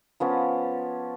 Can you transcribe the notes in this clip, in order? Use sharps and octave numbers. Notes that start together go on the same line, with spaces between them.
F3 B3 C#4